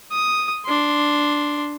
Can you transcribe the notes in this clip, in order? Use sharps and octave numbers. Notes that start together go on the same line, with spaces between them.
D#6
D4 C6